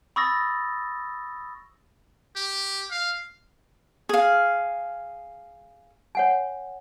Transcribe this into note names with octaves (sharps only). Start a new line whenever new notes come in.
B5 C#6 D#6 E6 A6 A#6
G4
F5
G#4 F5
C#5 F#5 G#5